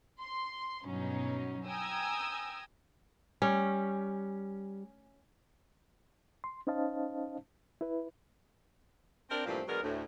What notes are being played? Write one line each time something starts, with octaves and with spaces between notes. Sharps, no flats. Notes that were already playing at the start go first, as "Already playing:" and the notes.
C6
G2 B2 F#3 C#4 D#4
G5 G#5 A#5 D#6 E6 G#6
G3 C#4
C6
C#4 D#4 C5 D#5 F5 A5
E4 B4
C4 D4 A#4
G2 A#2 E3 F3 A3 C4
D3 F#3 G#3 B3 A#4
D2 A2